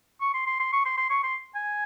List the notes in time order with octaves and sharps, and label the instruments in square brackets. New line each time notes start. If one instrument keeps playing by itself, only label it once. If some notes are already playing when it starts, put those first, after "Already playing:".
[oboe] C#6
C6
C6
C6
C#6
C6
C6
C#6
C6
G#5